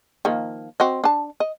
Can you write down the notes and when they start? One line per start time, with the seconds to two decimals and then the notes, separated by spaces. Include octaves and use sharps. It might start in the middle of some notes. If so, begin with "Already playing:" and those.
0.25 D#3 F3 A#3
0.80 C4 F#4 D#5
1.04 D4 A5
1.40 D#5